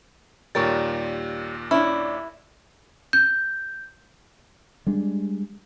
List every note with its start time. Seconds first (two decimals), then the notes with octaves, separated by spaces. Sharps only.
0.55 D#2 A#2 G3 A#4 C#5 A6
1.71 C#4 D4 E4
3.13 G6
4.86 G3 G#3 D4